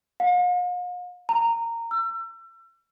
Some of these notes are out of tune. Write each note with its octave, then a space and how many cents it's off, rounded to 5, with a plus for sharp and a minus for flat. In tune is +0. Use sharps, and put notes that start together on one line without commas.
F5 +45
A#5 -15
E6 +35